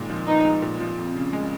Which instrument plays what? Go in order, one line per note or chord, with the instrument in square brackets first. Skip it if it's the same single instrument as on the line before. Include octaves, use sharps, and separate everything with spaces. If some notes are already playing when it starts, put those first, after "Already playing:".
Already playing: [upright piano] A#2 D#3 G#3
F3
[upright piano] B3 [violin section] D#4
[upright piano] G#3
A#2
F3
F2
C#3
G#3